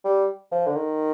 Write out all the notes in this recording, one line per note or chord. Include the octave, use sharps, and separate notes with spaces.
G3
F3
D3
D#3